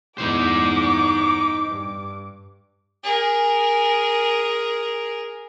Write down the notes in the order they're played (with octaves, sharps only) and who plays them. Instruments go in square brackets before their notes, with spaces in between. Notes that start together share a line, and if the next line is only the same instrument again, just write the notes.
[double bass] E2 G2 [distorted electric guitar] D#4 C5 [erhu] D6
[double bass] G2
[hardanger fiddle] G#4 A#4